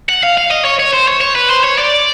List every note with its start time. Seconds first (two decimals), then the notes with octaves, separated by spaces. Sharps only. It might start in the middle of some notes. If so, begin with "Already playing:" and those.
0.09 F#5
0.23 F5
0.38 F5
0.51 D#5
0.65 C#5
0.80 C#5
0.94 C5
1.08 C#5
1.21 C#5
1.35 B4
1.50 C5
1.64 C#5
1.78 D5